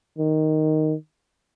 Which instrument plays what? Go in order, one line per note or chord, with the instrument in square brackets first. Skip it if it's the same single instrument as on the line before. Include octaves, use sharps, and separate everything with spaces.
[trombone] D#3